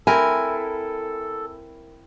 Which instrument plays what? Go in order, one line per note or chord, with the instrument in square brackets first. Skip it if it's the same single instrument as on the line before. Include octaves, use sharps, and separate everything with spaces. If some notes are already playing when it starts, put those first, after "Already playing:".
[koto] C4 E4 A#4 [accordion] A4 [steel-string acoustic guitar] G#5